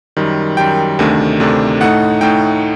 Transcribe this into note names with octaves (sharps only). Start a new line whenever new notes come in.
F#2 D#3 G3
F#2 D#3 G3 G5
D2 C3 D#3 A3 D4
D2 C3 D#3 A3 D4
A2 A3 D#4 F#5
A2 A3 D#4 G5